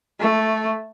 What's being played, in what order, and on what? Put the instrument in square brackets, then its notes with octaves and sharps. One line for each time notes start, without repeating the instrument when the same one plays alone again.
[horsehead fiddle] A3